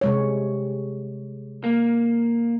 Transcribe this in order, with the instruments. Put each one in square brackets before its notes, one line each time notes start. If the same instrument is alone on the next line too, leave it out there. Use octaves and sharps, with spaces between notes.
[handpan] C3 G#3 C#5
[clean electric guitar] A#3